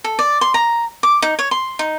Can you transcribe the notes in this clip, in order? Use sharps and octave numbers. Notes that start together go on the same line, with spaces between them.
A4
D5
C6
A#5
D6
D#4
C#5
C6
D#4